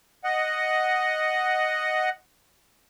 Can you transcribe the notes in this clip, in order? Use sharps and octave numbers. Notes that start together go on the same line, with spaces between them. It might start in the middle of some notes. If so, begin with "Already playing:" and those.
D#5 F#5